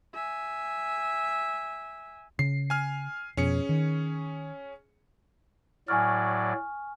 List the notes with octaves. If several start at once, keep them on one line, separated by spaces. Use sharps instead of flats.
E5 G#5
C#3 C7
G#5 F6
F2 B2 C#4 G#4 C#7
D#3
A2 F#3 D5 G#5 C#6 F6